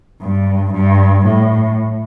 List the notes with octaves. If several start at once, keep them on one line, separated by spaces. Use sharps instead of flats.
G2
G2
A2